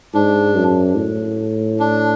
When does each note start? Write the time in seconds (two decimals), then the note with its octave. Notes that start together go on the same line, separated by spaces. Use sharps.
0.14 G#2 D4
0.56 F#2
0.96 A2
1.79 D4